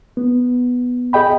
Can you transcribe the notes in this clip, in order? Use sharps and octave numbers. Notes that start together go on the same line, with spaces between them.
B3
G#4 D#5 G5 B5